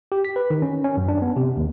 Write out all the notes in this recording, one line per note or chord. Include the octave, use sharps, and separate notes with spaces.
G4
B6
B4
D#3
C#4
C#4
F#2
D4
B3
C3
D#2